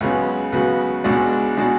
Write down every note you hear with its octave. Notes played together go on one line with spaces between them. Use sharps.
C#2 C#3 F#3 B3 F#4
C#2 C#3 F#3 B3 F#4
C#2 B2 G#3 D4 F#4
B2 G#3 D4 F#4